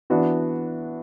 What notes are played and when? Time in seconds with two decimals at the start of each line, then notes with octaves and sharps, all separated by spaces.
0.10 E3 B3 D4 F#4